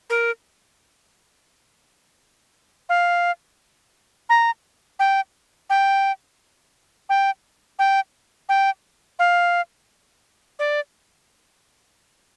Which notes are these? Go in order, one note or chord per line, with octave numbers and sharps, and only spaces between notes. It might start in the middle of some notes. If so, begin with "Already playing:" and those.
A#4
F5
A#5
G5
G5
G5
G5
G5
F5
D5